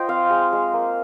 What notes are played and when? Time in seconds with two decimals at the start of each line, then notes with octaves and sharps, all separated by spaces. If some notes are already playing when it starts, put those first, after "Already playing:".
Already playing: F4 C5 D#5 G5
0.08 C4 F5
0.30 G#3
0.53 G#3
0.73 A#3